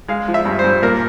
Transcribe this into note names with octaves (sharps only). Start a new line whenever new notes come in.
G#3 F5
F3
E5
G2
C5
G2
A#2 A#4